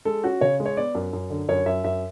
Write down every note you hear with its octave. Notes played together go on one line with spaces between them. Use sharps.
G#3 A4
C#4 F#4
C#3 C#5
G#3
C#5
B3 D5
F#2
F#2
D3
F#2 C#5
F#2 E5
F#2 E5